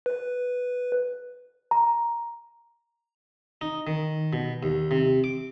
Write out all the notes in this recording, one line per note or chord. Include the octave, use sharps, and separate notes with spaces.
B4
A#5
D#4
D#3
B2
D#2
C3
D6